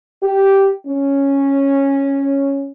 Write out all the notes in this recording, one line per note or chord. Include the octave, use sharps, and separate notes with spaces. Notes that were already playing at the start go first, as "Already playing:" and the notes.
G4
C#4